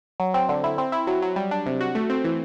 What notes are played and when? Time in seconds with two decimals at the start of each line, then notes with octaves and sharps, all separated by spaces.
0.20 F#3
0.34 C4
0.49 D3
0.64 E4
0.78 C4
0.92 E4
1.07 F#3
1.22 F#3
1.36 G3
1.51 D4
1.66 C3
1.81 F#4
1.95 A3
2.10 C4
2.24 E3